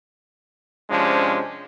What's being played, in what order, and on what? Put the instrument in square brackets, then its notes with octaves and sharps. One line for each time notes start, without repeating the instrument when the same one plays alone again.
[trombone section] C3 F3 G#3 C#4 D4